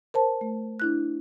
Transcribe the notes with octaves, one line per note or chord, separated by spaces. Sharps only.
A#4 C5 A5
A3
D4 E4 F#6